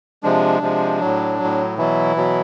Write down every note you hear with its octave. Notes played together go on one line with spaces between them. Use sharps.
C3 F3 G#3 D4
C3 F3 G#3
A2 F#3
F#3
A2
B2 E3 F#3 E4
B2 F#3